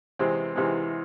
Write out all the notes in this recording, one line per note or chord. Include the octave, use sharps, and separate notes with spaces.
E2 C3 E3 G#3 C4
E2 C3 E3 G#3 C4